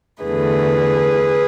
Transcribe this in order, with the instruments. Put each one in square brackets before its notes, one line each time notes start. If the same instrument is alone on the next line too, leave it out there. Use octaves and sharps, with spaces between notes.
[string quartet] E2 D3 A3 G#4 B4